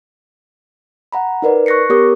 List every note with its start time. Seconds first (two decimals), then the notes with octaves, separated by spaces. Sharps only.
1.12 F#5 A#5 B5
1.42 D#4 A#4 B4 D5
1.66 C#6 F#6 A#6 C7 C#7
1.90 B3 G4 A#4 C#5 D6 D#6